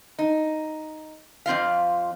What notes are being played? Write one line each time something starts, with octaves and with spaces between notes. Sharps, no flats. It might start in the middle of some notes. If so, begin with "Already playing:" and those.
D#4
F2 C4 F4 F5